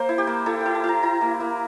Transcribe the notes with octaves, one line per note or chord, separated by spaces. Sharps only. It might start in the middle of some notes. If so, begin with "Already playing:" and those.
Already playing: A#3 C5
E4
G4
A#3
E4 A4
G5
E4
A5
E4 A#5
E4 A#5
A#3
A#3